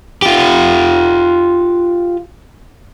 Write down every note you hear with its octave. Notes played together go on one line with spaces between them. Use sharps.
F4 G4